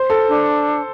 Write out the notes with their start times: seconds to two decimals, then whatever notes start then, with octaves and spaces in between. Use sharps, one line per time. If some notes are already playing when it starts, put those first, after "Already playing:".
Already playing: C5
0.10 A4
0.28 D4